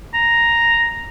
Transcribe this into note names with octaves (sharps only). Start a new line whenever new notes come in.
A#5